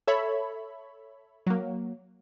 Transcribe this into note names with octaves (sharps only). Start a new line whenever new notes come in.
A4 C#5 E5 B5
F#3 A#3